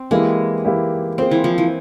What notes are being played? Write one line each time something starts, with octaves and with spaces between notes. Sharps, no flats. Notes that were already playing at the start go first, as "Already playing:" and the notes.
Already playing: C4
E3 G#3 A#3 E4 G4
E3 A#3 E4 G4
A#3 C4 F4 G#4 C5
E3
F3
E3